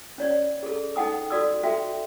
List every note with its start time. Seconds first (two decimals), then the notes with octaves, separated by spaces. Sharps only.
0.18 C#4 C#5 D5
0.63 G#4 A4
0.96 D#4 A4 F#5 G5 D#6
1.30 F#4 A4 D5 D#6 E6
1.63 F#4 A4 E5 G5